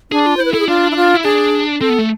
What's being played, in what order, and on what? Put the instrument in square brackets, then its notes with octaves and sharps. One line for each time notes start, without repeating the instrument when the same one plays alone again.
[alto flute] D4 [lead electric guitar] G#4
[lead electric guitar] F4
[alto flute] C5
[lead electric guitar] E4 [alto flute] B4
[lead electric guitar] E4 [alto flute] A4
[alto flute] G#4
[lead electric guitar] D4 [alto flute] F4
[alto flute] E4
F4
[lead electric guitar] E4
[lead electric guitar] D4 [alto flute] G#4
[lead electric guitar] C4 [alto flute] A4
[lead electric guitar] B3
A3